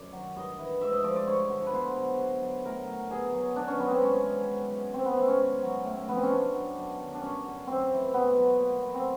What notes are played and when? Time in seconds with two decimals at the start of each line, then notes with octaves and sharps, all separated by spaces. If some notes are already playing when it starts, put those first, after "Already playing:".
Already playing: F#2 D5
0.13 D#3 F#3
0.36 G2 D#5
0.59 E3
0.81 G#2 E5
0.93 D#5
1.04 F3 D5
1.15 D5
1.27 G2 C#5
1.50 D3 F3
1.66 B4
1.73 B2 C5
1.97 F#3
2.19 B2
2.42 F#3
2.65 A2 A#4
2.87 F#3
3.10 B2 G#4
3.34 F#3
3.56 B2 D4
3.68 C#4
3.79 F#3 B3
3.90 C4
4.01 G#2 C#4
4.24 E3
4.47 B2
4.70 F#3
4.93 G#2 C4
5.05 B3
5.17 E3 C4
5.28 C#4
5.39 B2
5.62 F#3
5.85 A2
6.08 F3 B3
6.17 C4
6.23 C#4
6.30 B2 D4
6.54 F#3
6.76 F#2
6.99 D#3 F#3
7.14 D4
7.21 G2 C#4
7.45 D3 F#3
7.67 F#2 C4
7.90 C#3 E3
8.14 B2 B3
8.36 F#3
8.59 A#2
8.82 F#3
8.94 C4